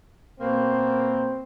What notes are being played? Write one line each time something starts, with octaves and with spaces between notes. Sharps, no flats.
B2 A#3 C4